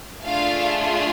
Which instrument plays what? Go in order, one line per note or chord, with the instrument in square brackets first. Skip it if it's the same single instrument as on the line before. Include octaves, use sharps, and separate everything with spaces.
[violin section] A3 D4 F4 G#4 F5